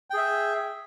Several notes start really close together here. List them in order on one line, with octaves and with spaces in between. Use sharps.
G5 G#4 E5